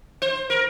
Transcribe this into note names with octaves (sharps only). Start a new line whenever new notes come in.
C5
A#4